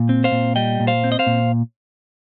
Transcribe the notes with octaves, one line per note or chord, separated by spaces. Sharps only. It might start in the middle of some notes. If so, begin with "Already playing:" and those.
Already playing: A#2
C4
C5 F5
A#2
G3 D#5 G5
A#2
C5 F5
C4
D#5
C5 F5
A#2